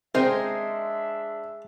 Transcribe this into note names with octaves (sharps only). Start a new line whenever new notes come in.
C3 G#3 D4 G#4 A#4 C5 E5 G5